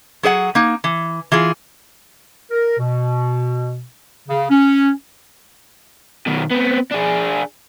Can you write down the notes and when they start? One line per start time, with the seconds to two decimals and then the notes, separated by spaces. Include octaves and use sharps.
0.23 F#3 G#4 C#5 F#5
0.55 A#3 D#4
0.84 E3
1.32 E3 F4 G#4
2.51 A#4
2.78 B2
4.29 C#3
4.50 C#4
6.27 B2 D#3
6.51 B3 C4
6.92 D4 G#4